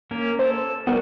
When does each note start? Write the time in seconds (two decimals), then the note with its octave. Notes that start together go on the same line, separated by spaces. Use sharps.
0.11 A#3 C#4 A#4
0.39 A4 C5
0.87 G3 A3 B3 F#4 A#4